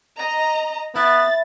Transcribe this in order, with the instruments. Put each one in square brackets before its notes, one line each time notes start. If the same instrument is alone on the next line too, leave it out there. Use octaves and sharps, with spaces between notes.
[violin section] D#5 A#5
[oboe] B3 [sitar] E4 [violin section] A6